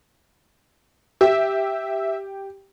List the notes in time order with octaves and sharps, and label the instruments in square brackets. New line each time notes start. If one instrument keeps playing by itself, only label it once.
[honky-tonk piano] G4 [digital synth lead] E5